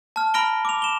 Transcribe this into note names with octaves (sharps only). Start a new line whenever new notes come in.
A5 F6
A#5 B5 F6 A#6 D7 G7
D6 F7
E7 G7